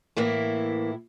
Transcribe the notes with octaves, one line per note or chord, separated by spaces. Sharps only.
A2 E3 A#3 E4